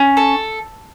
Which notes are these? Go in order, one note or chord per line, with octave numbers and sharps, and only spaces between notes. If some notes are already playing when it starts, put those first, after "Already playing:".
Already playing: C#4
A4